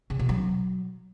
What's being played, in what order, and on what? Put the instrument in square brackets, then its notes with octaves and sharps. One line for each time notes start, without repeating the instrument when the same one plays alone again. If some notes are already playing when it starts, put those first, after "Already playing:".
[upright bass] C#3
B2
F#3